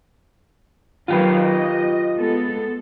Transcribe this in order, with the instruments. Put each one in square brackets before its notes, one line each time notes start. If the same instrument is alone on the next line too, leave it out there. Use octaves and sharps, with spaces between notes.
[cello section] D#3 F#3 F5 [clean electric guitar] F4 G4 B4
[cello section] D#5
G#3 B3 A4